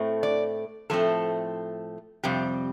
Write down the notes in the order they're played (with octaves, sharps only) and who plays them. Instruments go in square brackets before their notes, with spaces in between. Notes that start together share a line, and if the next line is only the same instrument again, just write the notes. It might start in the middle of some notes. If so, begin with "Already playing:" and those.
Already playing: [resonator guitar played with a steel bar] A2 A3 C4
D5
A2 F3 A3 C4 A4
F2 C3 G3 C4 G4